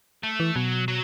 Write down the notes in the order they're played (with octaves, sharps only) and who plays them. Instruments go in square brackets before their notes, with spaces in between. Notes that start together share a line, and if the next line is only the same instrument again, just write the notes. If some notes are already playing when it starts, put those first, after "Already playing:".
[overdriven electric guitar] A3
[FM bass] E3
[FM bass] B2 [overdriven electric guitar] F#3
[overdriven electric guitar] F#3